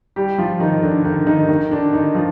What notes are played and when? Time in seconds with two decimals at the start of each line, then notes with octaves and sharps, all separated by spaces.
0.16 G3 G4
0.38 F3 F4
0.60 D#3 D#4
0.82 D3 D4
1.04 D#3 D#4
1.27 D#3 D#4
1.49 D#3 D#4
1.70 D3 D4
1.93 D#3 D#4
2.15 F3 F4